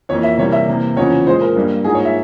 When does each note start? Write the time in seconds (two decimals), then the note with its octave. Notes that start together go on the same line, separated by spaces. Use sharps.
0.09 F2 E3 A#3 C#5
0.23 E5
0.38 C3 E3 G3 A#3 C#5
0.52 E5
0.68 C3 E3 A#3
0.97 E2 C#3 F3 C#5
1.27 A#2 G#3 C5
1.42 A#4
1.56 G2 G3 A#3
1.84 G#2 F3 A#3 G#4
1.95 C#5
2.05 E5